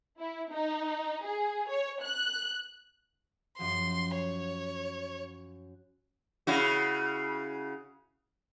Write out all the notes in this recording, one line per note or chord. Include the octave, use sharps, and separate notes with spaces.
E4
D#4
G#4
C#5
F#6
F#2 F3 F#3 C6
C#5
C#3 E4 F#4